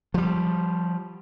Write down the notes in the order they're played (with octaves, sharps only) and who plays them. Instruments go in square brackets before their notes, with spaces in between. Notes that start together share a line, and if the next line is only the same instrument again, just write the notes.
[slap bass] F3 G3